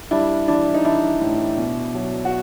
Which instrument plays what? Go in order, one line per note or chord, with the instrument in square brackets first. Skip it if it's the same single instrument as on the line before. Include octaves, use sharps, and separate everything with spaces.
[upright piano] G3 D4 E4
E3 D4 E4
D#4
E3 D4 E4
A2
B2
F#3
F#4